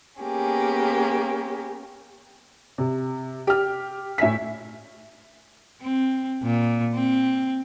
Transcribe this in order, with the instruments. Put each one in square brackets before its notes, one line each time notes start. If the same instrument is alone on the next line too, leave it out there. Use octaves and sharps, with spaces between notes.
[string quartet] A#3 B3 C#4 G4 G#4
[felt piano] C3
G4 F6
A2 E5 G#5 B6
[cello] C4
A#2
C4